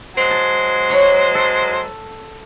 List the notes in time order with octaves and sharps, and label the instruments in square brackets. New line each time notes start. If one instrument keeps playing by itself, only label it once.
[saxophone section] F#3 G#3 C5
[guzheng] A5
C#5 A#5 B5
A4